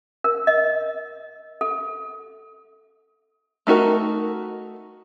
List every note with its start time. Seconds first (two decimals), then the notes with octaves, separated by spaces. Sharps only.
0.24 A#4
0.47 D#5
1.61 A4
3.67 A3 D#4 F#4 A#4